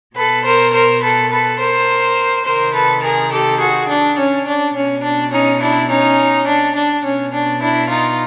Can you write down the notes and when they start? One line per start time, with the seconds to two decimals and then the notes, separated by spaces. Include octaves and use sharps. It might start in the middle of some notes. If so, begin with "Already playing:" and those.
0.17 B2 A4 B4
0.45 A#4 C5
0.73 A#4 C5
1.03 A4 B4
1.31 A4 B4
1.59 A#4 C5
2.45 C3 D#3 A#4 C5
2.74 A4 B4
3.03 G#4 A#4
3.32 G4 A4
3.60 F#4 G#4
3.88 D4
4.17 C#4
4.46 D4
4.75 B2 C#4
5.04 D4
5.31 C#4 D#4
5.60 D4 E4
5.89 C#4 D#4
6.46 D4
6.75 D4
7.04 B2 C#4
7.32 D4
7.61 D4 E4
7.89 D#4 F4